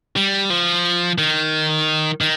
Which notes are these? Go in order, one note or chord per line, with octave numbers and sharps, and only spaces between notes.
G3
F3
D#3
D#3